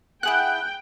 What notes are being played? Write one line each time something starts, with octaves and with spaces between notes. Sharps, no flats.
E4 G#4 F#5 G5 F#6